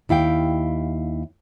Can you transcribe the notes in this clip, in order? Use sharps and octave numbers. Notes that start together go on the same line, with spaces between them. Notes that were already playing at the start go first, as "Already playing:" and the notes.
D#2 E4 F5 G5